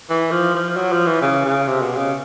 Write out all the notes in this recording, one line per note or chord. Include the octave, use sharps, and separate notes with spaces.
E3
F3
F3
F#3
F3
E3
C#3
C#3
C3
B2
C#3